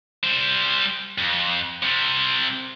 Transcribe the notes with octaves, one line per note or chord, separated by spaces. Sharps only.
G3 C5
F2
C3 G3